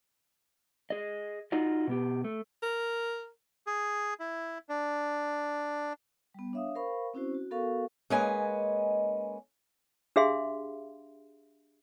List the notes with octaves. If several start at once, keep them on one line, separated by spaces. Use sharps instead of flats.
G#4 D#5
D#4 F4 F#4 D#5
B2 B3 G4
A3
A#4
G#4
E4
D4
G3 B3
D4 C#5 E5 F5 D#6
A#4 C5 F5 B5 C#6
C4 C#4 E4 F#4 C5
F#4
B3 F#4 A4 A#4 F5 C#6
G#3 A#3 C#4 B4 D#5 G#5
D4 G4 G#4 E5 F5 C6